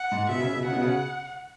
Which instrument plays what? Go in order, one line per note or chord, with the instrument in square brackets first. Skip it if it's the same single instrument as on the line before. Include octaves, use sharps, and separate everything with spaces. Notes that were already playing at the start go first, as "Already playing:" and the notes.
Already playing: [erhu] F#5
[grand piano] G#2
[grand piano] B2 [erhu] E5
[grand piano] C#3
B2
[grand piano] C#3 [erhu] F#5
[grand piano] B2
C#3